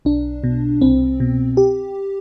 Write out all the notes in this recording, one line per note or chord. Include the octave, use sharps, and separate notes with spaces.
B1 D4
B2
C2 C4
B2
G4